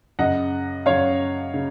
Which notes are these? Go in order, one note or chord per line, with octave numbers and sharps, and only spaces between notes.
F#2 C#3 D#5 F#5
F#2 C#3 C#5 F5
C#3